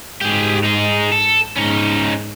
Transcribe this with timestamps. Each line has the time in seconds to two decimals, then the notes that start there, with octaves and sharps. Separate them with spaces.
0.21 G#2 G4 G#4
0.64 D#4 G#4
1.12 A4
1.57 G#2 C#4 D#4